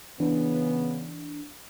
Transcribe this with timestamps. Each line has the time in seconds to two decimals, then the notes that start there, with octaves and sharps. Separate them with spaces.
0.20 C#3 E3 B3 D4